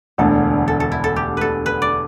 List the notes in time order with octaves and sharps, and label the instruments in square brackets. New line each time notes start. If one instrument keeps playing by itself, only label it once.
[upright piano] E1 D2 D3 [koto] A4
[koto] A4
A4
E4
A4
G4
A4 B4
B4
D5